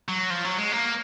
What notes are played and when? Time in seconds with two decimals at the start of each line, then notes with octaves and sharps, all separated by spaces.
0.08 F#3
0.30 F3
0.45 F#3
0.58 G#3
0.72 A#3